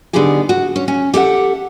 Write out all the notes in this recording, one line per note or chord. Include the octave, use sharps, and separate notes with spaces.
D3 B3 D4 D#4 G4 G#4
F#4
C#4
C#4
G4 A4 E5 F#5